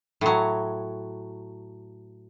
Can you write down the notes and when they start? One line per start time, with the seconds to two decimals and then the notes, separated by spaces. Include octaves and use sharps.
0.21 A2 F#3